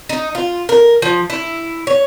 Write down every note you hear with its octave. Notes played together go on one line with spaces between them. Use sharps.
D#4
F4
A#4
F3
E4
C#5